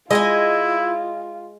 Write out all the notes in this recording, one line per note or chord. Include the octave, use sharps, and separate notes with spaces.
G#3 E4 F4 D#5 F#5 G#5